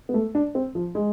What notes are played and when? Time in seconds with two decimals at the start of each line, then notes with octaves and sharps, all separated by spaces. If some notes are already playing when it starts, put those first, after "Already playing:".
0.09 B3
0.14 A3
0.35 D4
0.55 C4
0.75 F3
0.95 G#3